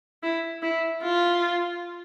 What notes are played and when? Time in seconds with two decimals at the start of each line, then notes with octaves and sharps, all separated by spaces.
0.23 E4
0.63 E4
1.03 F4